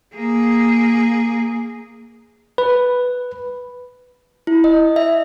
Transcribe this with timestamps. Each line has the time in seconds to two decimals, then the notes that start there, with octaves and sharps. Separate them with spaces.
0.14 A#3 G#4
2.58 B4
4.47 E4
4.64 D#5
4.96 E5